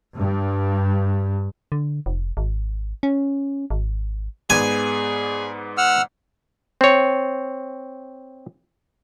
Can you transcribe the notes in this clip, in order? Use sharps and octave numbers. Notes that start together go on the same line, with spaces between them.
G2
D3
F1
G#1
C#4
G#1
G#2 B3 G#4 D5 G#5
F#5 E6 F6
C4 C#5